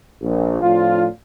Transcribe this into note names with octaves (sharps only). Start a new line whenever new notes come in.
A#1
A2 F3 C4 D4 F4